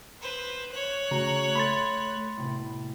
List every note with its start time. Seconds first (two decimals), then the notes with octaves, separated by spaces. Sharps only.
0.21 B4 C5
0.73 C#5 F#6
1.11 C#3 A3 F#4 A#5
1.56 A3 A4 B5 C6 A6
2.38 A2 C3